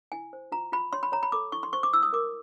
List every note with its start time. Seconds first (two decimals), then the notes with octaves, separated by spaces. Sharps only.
0.12 E4 G#5
0.33 C5
0.52 F4 A#5
0.72 F4 B5
0.93 C#5 C6
1.03 B5
1.12 C#5 A#5
1.23 B5
1.32 A4 D6
1.52 E4 C#6
1.63 C6
1.73 C5 C#6
1.83 D6
1.93 E4 E6
2.03 D#6
2.13 A#4 D6